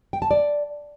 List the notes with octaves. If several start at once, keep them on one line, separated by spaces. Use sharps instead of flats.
G5
A5
D5